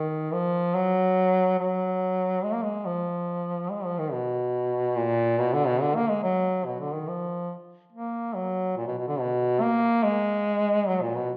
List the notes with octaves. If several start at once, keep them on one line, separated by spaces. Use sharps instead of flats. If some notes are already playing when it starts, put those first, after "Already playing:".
Already playing: D#3
F3
F#3
F#3
G#3
A#3
G#3
F3
G#3
F3
D#3
B2
A#2
B2
D3
B2
D3
A#3
G#3
F#3
B2
D3
D#3
F3
A#3
F#3
A#2
B2
B2
D3
B2
A#3
G#3
F#3
A#2
B2